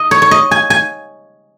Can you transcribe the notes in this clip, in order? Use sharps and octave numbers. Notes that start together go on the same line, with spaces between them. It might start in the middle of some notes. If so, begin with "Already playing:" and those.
Already playing: D#5
C#5
C#5
D#5
G#5
G#5